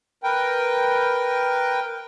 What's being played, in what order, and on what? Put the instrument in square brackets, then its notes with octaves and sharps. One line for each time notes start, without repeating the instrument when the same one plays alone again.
[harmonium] A#4 B4 G5